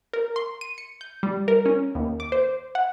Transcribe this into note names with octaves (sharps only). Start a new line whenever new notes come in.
A#4
C6
D#7
C#7
G6
G3
A#4
C#4
D#2
D6
C5
F#5